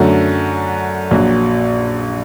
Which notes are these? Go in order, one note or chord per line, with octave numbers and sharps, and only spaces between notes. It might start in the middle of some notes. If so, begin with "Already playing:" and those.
Already playing: F#2 D3 F#3 A3
A#1 A#2 F#3